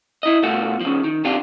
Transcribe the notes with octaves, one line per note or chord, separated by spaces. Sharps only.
E4 D#5
B2 A3 F4 F#4
C#3 F3
D#3
C3 D4 F4 G4